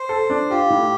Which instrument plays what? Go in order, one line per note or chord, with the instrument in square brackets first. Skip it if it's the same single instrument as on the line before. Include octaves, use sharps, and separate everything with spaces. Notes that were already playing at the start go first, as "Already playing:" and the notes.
Already playing: [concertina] C5
[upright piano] A4
D4
[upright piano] F4 [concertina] G4
[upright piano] A2